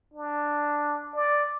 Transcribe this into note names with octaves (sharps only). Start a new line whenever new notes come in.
D4
D5